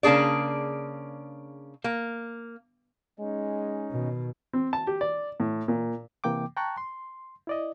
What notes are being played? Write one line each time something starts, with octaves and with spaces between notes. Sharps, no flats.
C#3 A#3 D4 G#4 D5
A#3
G#3 C#4 D#4
B2 D#3
C4
A5
G4
D5
A2
A#2
C3 E3 A#3 G5 D6
G5 A5 A#5 C#6 F#6
C6
E4 D5 D#5